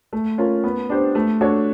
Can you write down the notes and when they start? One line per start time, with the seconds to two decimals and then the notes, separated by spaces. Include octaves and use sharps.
0.13 A3
0.38 C#4 F4 A#4
0.64 B3
0.90 D4 G4 C5
1.15 A3
1.41 D4 F#4 A4 C#5